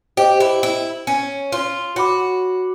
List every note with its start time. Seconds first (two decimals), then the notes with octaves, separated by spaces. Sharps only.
0.17 G4 C5 D#5 G5
0.40 E4
0.63 E4
1.07 C#4
1.52 F4
1.96 F#4 C#5 F#5 B5 D6